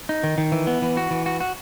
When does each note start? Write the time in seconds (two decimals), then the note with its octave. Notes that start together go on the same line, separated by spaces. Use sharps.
0.09 D#4
0.24 D#3
0.38 D#3
0.52 E3
0.67 B3
0.82 E3
0.97 F#4
1.11 E3
1.26 F#4
1.41 F#4